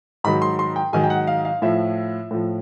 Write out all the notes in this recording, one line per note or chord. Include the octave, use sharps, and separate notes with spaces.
G#2 D#3 F#3 B5
C6
C6
G5
G#2 D#3 F#3 G#5
G5
F#5
F5
F5
A2 F3 E5
A2 F3